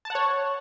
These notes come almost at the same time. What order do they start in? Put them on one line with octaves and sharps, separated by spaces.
A5 F#5 C#5